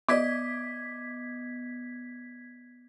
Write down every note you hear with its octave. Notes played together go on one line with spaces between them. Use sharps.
B3 D5 D#5 D6 G#6 B6